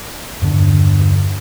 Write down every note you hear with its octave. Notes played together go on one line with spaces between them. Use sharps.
E2 G2 D3 D4